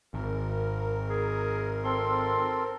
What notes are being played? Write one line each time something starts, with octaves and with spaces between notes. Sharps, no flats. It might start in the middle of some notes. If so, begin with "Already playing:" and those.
G#1 A#4
G#4
C4 A4 C6